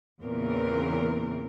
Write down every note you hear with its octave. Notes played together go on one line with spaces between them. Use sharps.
E2 A#2 C#3 E3 C4 A#4